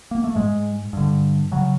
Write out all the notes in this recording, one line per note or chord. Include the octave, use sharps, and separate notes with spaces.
A#3
A3
G#2 G#3
G2 D3
C#3 F#3